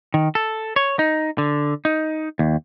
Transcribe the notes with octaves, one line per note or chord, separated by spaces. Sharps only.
D#3
A4
C#5
D#4
D3
D#4
D#2